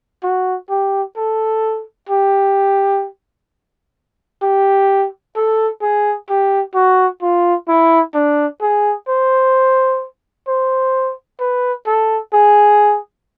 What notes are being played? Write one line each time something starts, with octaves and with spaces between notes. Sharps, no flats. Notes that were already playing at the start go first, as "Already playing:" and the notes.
F#4
G4
A4
G4
G4
A4
G#4
G4
F#4
F4
E4
D4
G#4
C5
C5
B4
A4
G#4